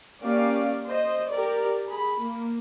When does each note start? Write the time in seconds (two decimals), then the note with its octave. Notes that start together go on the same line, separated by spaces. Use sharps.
0.22 A#3 C#4 G4 D5 F5
0.87 C5 D#5
1.30 G4 A#4 D5
1.86 G#4 B5
2.21 A#3